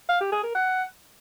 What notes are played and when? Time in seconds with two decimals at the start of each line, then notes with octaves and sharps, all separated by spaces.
0.09 F5
0.20 G4
0.32 G#4
0.43 A#4
0.55 F#5